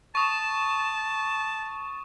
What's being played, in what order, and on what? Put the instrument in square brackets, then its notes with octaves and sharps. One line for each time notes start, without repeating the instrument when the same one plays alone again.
[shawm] A5 [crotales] C#6 D#6 E7